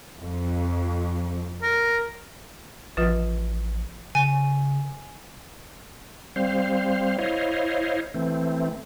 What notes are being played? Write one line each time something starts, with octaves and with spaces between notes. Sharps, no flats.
F2
A#4
A1 F3 F4 B4
C#3 G#5
G3 C4 C5 F5
E4 C5 C#5 D#5 F5
E3 A3 C4